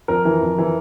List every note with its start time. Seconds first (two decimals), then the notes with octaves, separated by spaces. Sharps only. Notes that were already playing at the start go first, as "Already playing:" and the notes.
0.08 F2 A#4
0.25 E3
0.42 F2
0.58 E3